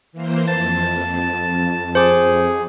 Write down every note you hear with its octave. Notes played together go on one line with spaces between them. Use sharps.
E3 A#3 C5
F2 A5
G#4 C5 D6